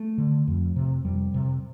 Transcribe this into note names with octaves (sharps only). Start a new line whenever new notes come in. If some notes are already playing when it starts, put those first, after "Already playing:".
Already playing: A3
D3
F2
C3
F2 G3
C3